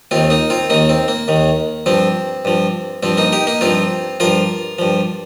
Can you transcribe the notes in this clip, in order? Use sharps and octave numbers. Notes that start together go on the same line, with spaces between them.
D#2 D#3 C4 F4
A#3 D#4
C4 F4
D#2 D#3 A#3 D#4
C4
A#3
D#2 D#3
G2 F3 C4
G2 F3
G2 F3 C4
A#3 D#4
D#4 G4
A#3 D#4
G2 F3 C4 F4
G2 F3 F4 A#4
G2 F3